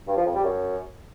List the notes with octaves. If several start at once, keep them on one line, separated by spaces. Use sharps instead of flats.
G2
F3
F2
G3
F#2